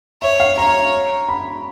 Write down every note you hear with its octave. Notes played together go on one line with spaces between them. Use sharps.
C#5 E5
F5
C#5 A#5
B5